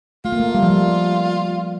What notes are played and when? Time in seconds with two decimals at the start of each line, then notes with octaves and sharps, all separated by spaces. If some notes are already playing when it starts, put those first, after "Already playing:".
0.25 A3 F4
0.32 A#3
0.40 A3
0.55 G3
0.63 F3
0.70 G3